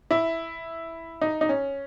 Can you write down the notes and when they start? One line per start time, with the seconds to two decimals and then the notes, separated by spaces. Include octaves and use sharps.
0.11 E4
1.21 D#4
1.41 D#4
1.49 C#4